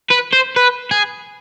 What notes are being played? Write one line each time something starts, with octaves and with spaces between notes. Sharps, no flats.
B4
C5
B4
G#4